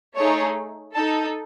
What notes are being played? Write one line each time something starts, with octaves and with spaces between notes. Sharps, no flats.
A3 D#4 G#4 C#5
D#4 A4 A5